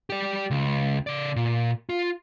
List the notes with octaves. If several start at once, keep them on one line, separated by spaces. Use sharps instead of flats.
G4 D5
C#2
C#3 D5
A#2
F4